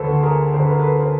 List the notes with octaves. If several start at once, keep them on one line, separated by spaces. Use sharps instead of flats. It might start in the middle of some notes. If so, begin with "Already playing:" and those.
Already playing: D2 A4 B4 C5
D3
G#4 A#4
D3 C5
B4
A#4
A4 B4
A#4 C5